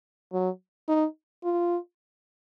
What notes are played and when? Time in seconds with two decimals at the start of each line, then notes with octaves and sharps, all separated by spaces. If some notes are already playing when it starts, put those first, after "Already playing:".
0.33 F#3
0.88 D#4
1.44 F4